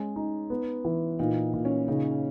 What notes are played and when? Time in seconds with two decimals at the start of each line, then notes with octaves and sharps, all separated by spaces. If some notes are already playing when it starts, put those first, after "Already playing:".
Already playing: G#3 C#4
0.16 D#4
0.50 B3
0.85 E3
1.19 A#2 D#4
1.53 A#2
1.65 C#4
1.88 C#3 D#4